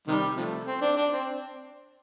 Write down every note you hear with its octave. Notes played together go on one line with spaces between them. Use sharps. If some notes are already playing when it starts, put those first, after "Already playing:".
C3 D#3 G3
C3 F3 A3
C4
D4
D4
C4